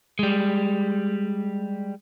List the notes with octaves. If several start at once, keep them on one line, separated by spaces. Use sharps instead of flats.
G3 G#3